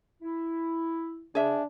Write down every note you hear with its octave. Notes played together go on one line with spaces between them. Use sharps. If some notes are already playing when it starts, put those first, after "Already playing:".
E4
C#3 D4 G#4 E5